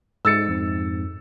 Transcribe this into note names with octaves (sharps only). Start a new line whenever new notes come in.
G#2 G#3 E6 A6 C#7
F2 G#2